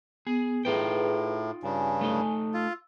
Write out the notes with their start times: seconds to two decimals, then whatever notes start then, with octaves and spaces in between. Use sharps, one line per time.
0.27 B3 G#4
0.65 A2 D#4 F4 G#4 B4 G5
1.63 G2 C#3 G#5
2.01 A3 D#4
2.54 F4 E6